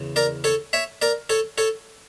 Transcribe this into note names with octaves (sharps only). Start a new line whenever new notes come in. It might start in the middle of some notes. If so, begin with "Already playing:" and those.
Already playing: E2 C#3
A#4 D5
A4 C#5
C#5 E5
A#4 D5
A4 C#5
A4 C#5